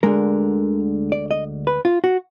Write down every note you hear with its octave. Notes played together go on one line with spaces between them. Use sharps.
D2 D3 G#3 A#4
D5
D#5
B4
F4
F#4